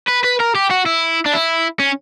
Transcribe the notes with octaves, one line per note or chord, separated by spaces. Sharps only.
B4
B4
A#4
G4
F#4
E4
D4
E4
C#4